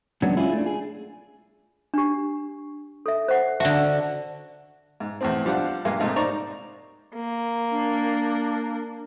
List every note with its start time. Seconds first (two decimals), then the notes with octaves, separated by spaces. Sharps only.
0.22 F#3 G#3 A#3 B3 C#4 D4
0.36 G#3 C#4 E4 F4 G4 G#4
0.53 A3 D4
0.66 G#4
1.94 D4 G4
3.06 A4 E5
3.28 C5 F#5
3.60 D3 F#4 E5 A5
5.00 G#2
5.21 E2 A2 C4
5.45 F3 G3 D4 F5 F#5
5.85 G2 G#3 A#3
6.00 G#2 C3 A3 A#3 D#4
6.16 D#4 C5 D5 A#5 C#6
7.15 A#3
7.71 D4